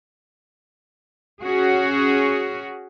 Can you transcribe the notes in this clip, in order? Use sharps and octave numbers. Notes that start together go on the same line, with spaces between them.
C#4 F#4 G#4